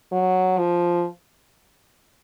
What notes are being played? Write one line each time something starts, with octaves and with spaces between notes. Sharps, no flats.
F#3
F3